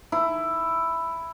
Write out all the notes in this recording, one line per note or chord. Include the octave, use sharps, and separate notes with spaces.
E4